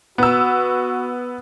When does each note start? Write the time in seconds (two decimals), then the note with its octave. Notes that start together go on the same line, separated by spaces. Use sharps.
0.18 B3 F#4 E6